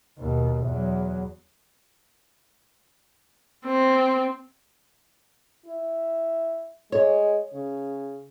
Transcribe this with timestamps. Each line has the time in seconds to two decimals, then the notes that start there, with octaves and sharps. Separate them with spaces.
0.19 D#2 B2
0.65 E2 F#3
3.66 C4
5.66 E4
6.92 G#3 C#5
7.54 C#3